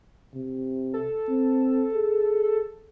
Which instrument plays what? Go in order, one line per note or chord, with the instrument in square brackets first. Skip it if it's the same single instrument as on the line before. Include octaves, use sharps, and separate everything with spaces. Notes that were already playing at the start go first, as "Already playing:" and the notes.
[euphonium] C3
[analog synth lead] A4
[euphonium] C4
G#4